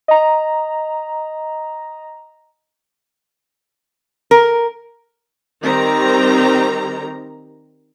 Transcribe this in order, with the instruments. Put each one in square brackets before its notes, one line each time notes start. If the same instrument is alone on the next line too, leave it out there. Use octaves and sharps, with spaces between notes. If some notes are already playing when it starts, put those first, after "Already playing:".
[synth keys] D#5 A#5
[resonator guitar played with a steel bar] A#4
[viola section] D#3 G3 C4 G4 A#5